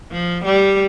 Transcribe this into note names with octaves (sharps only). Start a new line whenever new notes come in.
F3
G3